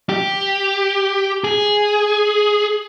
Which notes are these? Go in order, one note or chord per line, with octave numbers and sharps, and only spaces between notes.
G4
G#4